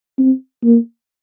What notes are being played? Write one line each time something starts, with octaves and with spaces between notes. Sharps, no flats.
C4
A#3